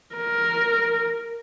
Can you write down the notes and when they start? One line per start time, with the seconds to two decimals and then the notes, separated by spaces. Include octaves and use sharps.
0.15 A#4